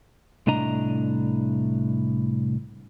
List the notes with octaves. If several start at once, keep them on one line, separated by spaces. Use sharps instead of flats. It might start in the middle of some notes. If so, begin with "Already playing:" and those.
C2 A2 D4 D#5 A#5